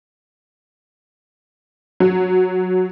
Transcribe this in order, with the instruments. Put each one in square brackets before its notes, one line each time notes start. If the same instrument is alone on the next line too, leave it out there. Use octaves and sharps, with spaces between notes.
[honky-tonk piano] F#3